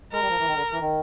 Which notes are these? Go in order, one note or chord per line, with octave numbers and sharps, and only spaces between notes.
G#3 A#4
G3
F3
E3
D#3
D3
E3
D#3